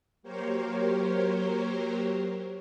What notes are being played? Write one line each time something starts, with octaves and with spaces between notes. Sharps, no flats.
F#3 A#3 G4 A#4 C5 C#5